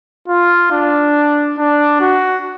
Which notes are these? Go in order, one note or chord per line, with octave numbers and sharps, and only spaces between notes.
F4
D4
D4
F#4